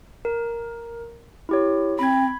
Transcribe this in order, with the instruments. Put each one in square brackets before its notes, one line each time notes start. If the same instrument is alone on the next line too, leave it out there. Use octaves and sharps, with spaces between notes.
[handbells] A#4
E4 G4 C#5
[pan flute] C4 [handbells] B5 G#6